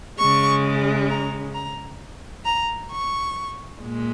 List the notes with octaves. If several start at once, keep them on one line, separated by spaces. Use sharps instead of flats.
C#3 G#3 C#6
A#5
A#5
A#5
C#6
A#2 G#3